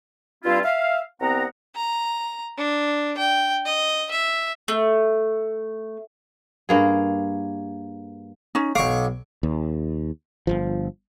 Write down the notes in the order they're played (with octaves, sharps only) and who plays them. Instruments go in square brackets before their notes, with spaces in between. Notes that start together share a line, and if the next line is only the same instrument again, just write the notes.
[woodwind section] G2 G3 C4 E4 F4
E5 F5
C2 B3 C4 F#5 A#5
[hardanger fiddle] A#5
D4
G5
D#5
E5
[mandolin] A3
[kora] G2 A#3 G#4
[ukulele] C#4 D#4
[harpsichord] B1 C#6 D6 [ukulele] F5
[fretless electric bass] D#2
G1 C2 F3